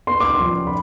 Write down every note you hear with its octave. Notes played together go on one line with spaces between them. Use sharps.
B3 C6
D6
C6
F3
B5